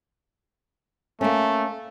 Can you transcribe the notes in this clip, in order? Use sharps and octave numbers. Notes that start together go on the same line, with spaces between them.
A3 A#3 C#4